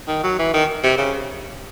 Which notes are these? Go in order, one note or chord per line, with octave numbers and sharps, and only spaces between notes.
D#3
F#3
E3
D#3
C3
C#3